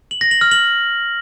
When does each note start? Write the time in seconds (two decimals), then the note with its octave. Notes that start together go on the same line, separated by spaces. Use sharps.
0.11 F#7
0.21 A#6
0.31 F#7
0.41 F6
0.51 F#7